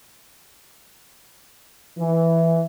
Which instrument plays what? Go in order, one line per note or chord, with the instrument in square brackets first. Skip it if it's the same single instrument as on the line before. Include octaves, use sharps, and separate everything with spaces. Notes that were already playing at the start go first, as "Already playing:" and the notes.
[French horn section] E3